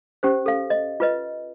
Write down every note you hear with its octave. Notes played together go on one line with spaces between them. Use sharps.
C#4 G4 C5
A4 F5
D#5
F4 B4 D#5